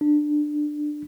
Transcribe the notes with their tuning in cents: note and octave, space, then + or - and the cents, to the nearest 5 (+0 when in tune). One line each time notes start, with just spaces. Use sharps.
D4 +15